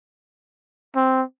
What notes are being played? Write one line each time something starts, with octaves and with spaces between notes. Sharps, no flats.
C4